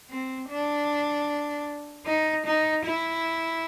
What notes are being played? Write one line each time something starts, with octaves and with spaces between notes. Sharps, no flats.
C4
D4
D#4
D#4
E4